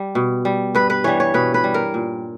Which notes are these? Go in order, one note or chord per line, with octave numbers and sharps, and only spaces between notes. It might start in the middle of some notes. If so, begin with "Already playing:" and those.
Already playing: G3
B2
G3
G2 B4
B4
E3 G3 C#5
C#5
B2 B4
B4
G3
A#4
A#2